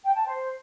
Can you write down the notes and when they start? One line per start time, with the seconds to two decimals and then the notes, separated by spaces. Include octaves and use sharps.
0.04 G5
0.15 A5
0.26 C5